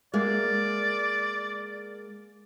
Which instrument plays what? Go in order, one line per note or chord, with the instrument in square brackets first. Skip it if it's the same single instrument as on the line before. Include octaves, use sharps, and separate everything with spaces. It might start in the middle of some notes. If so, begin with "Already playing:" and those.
[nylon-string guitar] G#3 A#3 E5 [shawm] D5